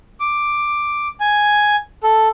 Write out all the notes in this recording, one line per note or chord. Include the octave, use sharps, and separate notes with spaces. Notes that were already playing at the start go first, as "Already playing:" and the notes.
D6
G#5
A4